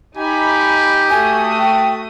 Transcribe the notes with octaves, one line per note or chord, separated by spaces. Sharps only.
D#4 G4 G#5 B5
A3 F#4 G#5 D#6
G5